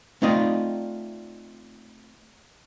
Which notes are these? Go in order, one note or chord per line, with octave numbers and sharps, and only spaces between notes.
A3 C4 D#4 F4 D5 D#5